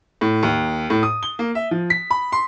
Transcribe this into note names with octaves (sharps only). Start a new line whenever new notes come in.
A2
D#2
A2
D#6
G7
A#3
E5
F3
B6
B5
C6